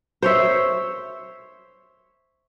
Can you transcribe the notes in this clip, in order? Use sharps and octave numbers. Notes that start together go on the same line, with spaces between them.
C5 C#5 E5